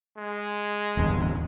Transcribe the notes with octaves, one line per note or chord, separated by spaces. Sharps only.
G#3
D1 E2 G2